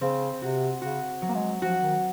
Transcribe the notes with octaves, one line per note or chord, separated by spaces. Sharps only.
C#3 C4
C3 F#4
C#3 F#4
F#3
A#3
G#3
F3 F#4
D#3